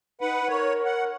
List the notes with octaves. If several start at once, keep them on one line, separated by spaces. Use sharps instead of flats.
D#4 B4 F#5
A#4 C#5
F#5